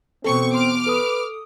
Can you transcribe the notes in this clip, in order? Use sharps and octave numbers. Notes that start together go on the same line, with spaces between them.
E2 B2 C4 A4 C#6
C6 D6 F6
A4 B4 D#6